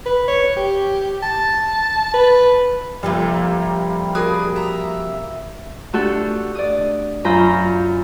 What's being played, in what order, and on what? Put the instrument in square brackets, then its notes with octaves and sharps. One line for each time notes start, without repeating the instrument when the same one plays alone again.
[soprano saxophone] B4
C#5
G4
A5
B4
[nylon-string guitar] C3 F3 [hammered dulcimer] G3 A#3 [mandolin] A3 D#4 F5
[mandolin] D4 G#4 D#6 [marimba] F#4 A#4 B5
[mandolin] E5 A#5
[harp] A3 D4 F#4 G4 A4
D5 D#6
F#2 F4 A#5 B5 G6